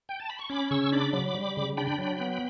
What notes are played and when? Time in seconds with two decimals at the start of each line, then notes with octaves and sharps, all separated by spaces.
0.09 G5
0.20 A5
0.30 B5
0.39 C#6
0.50 C#4 B5 D6
0.71 C#3 C#6 E6
0.92 D4 B5 D6
1.13 F#3
1.35 G3
1.57 C#3
1.77 D4 G5 B5
1.99 F#3
2.20 B3